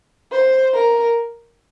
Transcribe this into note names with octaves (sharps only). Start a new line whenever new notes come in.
C5
A#4